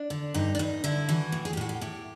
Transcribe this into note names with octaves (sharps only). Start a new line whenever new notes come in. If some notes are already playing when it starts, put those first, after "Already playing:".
Already playing: D4
D3
G2 D#4
D4
G2 D#4
D3 E4
E3 F#4
A2
G#4
G4
A2 F#4
G4
A2 G4